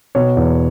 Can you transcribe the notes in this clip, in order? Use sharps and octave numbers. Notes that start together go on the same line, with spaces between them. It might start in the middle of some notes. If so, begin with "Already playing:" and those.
B2 C#5
E2